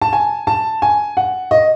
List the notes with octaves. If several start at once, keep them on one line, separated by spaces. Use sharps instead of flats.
A5
G#5
A5
G#5
F#5
D#5